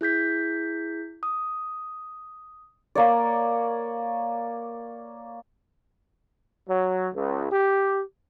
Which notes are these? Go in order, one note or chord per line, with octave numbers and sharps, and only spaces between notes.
E4 G#4 G6 B6
D#6
A#3 C#5 D5
F#3
C#2
G4